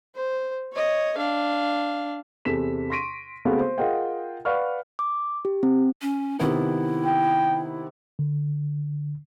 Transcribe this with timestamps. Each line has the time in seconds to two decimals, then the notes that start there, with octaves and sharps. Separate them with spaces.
0.15 C5
0.73 C#5 D#5
1.17 D4 F5
2.45 E2 C3 A4 B6 E7
2.90 C6 C#6 A#6 B6 D7 D#7
3.45 C#3 G#3 A3 B3 C4 F#4
3.60 C5
3.78 F4 G#4 A#4 D#5 F#5 G5
4.45 B4 D5 F5 F#5 C#6 F6
4.99 D6
5.45 G4
5.63 C4
6.02 C#4
6.39 C3 D#3 B3 E4
7.04 G5
8.19 D3